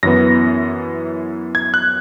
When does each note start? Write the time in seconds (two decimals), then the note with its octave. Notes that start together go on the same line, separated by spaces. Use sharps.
0.03 F#2 E3 B3 A#6
1.55 G#6
1.74 F#6